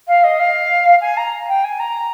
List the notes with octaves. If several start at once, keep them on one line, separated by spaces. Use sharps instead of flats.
F5
D#5
F5
G#5
A#5
G5
G#5
A#5